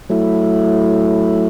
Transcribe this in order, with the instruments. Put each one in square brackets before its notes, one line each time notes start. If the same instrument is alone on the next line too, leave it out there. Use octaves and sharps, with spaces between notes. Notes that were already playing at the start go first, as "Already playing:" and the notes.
[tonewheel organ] F#3 A3 E4